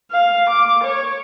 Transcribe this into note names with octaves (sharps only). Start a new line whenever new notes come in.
F5
D6
C#5